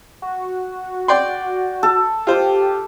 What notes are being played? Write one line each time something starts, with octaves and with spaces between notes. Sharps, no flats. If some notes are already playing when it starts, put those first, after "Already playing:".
F#4
D5 G5 C6
A4
F4 G4 C5